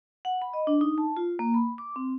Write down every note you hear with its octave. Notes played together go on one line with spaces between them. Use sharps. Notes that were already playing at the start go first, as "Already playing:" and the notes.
F#5
B5
D#5
D4
D#4
A5
F4
A#3
B5
D6
C4